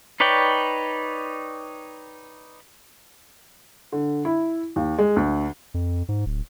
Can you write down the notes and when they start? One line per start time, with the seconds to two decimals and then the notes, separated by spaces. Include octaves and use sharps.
0.20 D#4 B4 C#5 D5 G5
3.92 D3
4.25 E4
4.76 D#2
4.98 G#3
5.16 D2
5.74 F2
6.09 G#2
6.26 D1